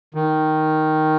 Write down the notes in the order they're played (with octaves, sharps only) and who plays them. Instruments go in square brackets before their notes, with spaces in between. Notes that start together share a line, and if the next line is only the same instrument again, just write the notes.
[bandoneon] D#3